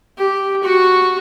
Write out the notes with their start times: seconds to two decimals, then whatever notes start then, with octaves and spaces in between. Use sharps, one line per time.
0.17 G4
0.63 F#4 C#6